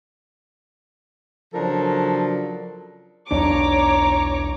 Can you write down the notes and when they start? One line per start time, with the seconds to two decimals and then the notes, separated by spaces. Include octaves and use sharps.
1.54 C#3 F3 F#3 D4 A4 A#4
3.31 B1 E2 D4 C#5 A#5 D6